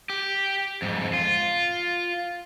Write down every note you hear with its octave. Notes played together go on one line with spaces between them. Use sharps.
G4
F2 G#2
F4